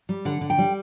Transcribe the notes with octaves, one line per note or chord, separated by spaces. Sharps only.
G3
D3 F#5
D3
G5
G3